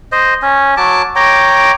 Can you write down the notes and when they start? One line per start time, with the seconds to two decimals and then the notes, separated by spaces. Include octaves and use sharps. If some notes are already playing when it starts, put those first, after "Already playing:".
0.12 C5 D#5
0.42 C#4
0.77 F#3 A5 D6
1.16 C#5 G5 A#5 D6